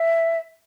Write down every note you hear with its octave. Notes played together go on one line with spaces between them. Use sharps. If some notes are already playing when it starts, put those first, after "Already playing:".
Already playing: E5